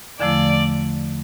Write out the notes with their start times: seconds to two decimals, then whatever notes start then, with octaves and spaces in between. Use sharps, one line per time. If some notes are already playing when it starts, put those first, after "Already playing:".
0.20 E2 D3 F3 A3 E4 D5